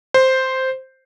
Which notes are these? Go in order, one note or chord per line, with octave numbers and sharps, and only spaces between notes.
C5